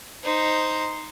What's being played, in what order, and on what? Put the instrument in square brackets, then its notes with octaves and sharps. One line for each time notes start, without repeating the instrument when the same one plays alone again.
[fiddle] D#4 C5